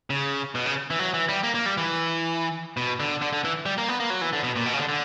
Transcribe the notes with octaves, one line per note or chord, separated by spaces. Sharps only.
C#3
B2
C#3
E3
F#3
E3
G3
A#3
A#3
G3
E3
B2
D3
D3
D3
E3
G3
A#3
B3
A#3
F#3
E3
D3
B2
A#2
B2
C#3
D3
D3